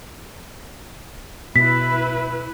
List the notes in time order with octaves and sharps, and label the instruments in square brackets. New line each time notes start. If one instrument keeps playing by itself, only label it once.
[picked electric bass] B2 [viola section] E4 B4 [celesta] B6